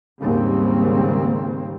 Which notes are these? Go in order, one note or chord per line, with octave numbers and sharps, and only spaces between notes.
D#2 G#2 C#3 G3 A#3 C4